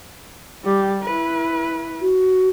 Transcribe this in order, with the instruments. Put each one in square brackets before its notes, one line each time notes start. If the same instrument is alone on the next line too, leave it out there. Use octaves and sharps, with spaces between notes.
[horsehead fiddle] G3 G4
E4 B4
[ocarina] F#4